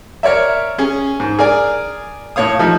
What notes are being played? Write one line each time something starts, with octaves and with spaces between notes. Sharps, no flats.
A#4 C#5 D5 E5
C#4 G#4
G#2
G#4 A#4 D5 G#5
A2 C#5 F5 D#6
F3 A3 D#4